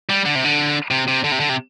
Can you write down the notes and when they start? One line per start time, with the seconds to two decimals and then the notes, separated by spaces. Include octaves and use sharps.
0.09 G3
0.25 D3
0.35 C3
0.45 D3
0.91 C3
1.08 C3
1.24 D3
1.32 C3
1.40 D3
1.49 C3